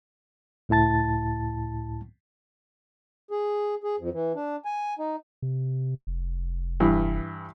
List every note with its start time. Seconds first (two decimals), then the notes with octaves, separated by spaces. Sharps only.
0.69 C#2 A2 E4 A5 A6
3.31 G#4
3.84 G#4
3.99 F2
4.13 E3
4.35 D4
4.65 G#5
4.99 D#4
5.42 C3
6.07 F1
6.80 G2 E3